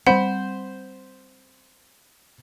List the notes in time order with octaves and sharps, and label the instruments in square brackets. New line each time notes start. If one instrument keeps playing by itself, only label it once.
[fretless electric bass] G3 A3 C4 [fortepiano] C5 B5 [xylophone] F#5